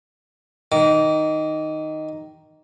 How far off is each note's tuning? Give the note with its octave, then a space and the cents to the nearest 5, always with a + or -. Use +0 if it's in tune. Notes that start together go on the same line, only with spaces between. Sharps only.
D#3 +0 D6 -30